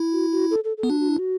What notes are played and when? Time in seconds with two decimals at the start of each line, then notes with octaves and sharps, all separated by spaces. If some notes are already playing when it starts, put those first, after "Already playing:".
Already playing: E4
0.12 F#4
0.32 F#4
0.51 A4
0.64 A4
0.77 A4
0.83 B3
0.90 D4 F#4
1.00 F#4
1.09 E4
1.19 F#4